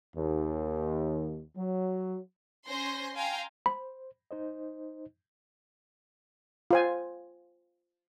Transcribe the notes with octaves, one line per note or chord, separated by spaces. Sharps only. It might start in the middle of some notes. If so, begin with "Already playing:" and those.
D#2
F#3
C#4 C5 G#5 C6 G6 A#6
F5 G5 G#5 A#5 C6
C5 B5
D#4 C5 D#5
F4 C5 G#5